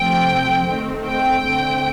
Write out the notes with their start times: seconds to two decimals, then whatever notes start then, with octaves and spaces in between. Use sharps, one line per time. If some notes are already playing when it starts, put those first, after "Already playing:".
Already playing: C3 F3 A3 C4 G5
0.67 D#3 A3 C4
1.06 G5
1.43 D3 A3 C4